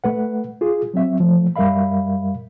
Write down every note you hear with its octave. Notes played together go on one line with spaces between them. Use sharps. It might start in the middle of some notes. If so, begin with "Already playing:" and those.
A3 B4 F#5
F4 G#4
F#3 C4 E5
F3 A3
F#2 G3 A#4 E5 F5 B5